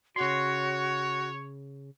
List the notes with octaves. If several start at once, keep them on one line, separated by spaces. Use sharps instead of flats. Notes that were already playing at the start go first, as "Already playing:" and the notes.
C#3 F#4 C#5 C6